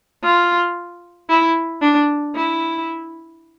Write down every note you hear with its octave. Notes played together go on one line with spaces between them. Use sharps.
F4
E4
D4
E4